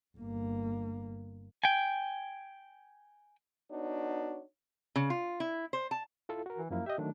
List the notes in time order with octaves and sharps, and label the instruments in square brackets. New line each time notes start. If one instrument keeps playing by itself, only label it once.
[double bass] G1 A#3
[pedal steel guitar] G5 G#5
[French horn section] B3 D4 D#4 F#4 C#5
[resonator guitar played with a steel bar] C#3
F4
E4
C5
A5
[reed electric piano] E4 F4 A4
F#4 A#4
[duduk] E3
[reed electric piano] F#2 F3 E4 [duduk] A#3
[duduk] G4 [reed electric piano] D#5 E5
[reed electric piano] D#3 F#3 A3 [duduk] D4